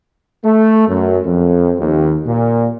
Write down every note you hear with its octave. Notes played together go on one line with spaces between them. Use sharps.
A3
F#2
F2
D#2
A#2